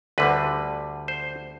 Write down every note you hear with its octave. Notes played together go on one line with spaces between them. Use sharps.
D2 D3 G3 B4
C5